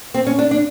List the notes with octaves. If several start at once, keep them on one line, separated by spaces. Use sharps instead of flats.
C4
C#4
D4
D4